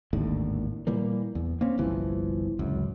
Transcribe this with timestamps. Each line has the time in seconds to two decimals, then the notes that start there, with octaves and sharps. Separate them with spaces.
0.13 G#1 D#2 A2 D3
0.87 A#2 E3 G3 A#3
1.35 E2
1.61 A#3 C4 C#4
1.78 G1 C2 E3 F3
2.59 D1 C#2 F#2